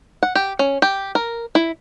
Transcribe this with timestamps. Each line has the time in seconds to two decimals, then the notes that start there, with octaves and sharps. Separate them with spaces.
0.23 F#5
0.35 G4
0.59 C#4
0.82 G4
1.15 A#4
1.55 E4